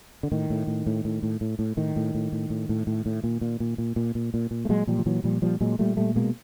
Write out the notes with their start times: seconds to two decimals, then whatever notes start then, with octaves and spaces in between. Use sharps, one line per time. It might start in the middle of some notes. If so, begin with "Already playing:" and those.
0.23 D3
0.32 A2 D#3
0.50 A2
0.67 A2
0.87 A2
1.05 A2
1.23 A2
1.41 A2
1.59 A2
1.77 A2 D#3
1.96 A2
2.15 A2
2.32 A2
2.50 A2
2.69 A2
2.87 A2
3.06 A2
3.24 A#2
3.41 A#2
3.60 A#2
3.78 A#2
3.96 A#2
4.15 A#2
4.34 A#2
4.51 A#2
4.65 A3
4.69 A#2 F#3 G#3
4.87 A#2 F3 G3
4.99 F3
5.06 A#2 E3 F#3
5.24 A#2 F3 G3
5.42 A#2 F3 G3
5.61 A#2 F#3 G#3
5.79 A#2 G3 A3
5.97 A#2 G3 A3
6.16 B2 G#3 A#3